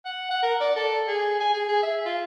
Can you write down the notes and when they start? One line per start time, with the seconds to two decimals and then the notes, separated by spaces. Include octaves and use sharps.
0.06 F#5
0.31 F#5
0.43 A#4
0.61 D5
0.77 A4
1.08 G#4
1.40 G#5
1.54 G#4
1.69 G#4
1.83 E5
2.06 F4